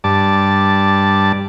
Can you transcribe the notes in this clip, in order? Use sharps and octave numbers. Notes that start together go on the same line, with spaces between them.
G2 D5 A5